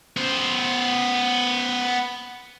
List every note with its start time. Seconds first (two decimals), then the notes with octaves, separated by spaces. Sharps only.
0.17 B3 C5